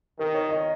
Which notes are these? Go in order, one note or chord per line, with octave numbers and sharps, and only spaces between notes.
D#3 A#4
C#5
D#5